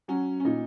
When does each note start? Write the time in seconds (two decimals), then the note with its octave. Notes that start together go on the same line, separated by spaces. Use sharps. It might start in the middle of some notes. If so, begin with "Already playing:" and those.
0.08 F#3 C#4
0.40 C#4
0.45 A#2 D#4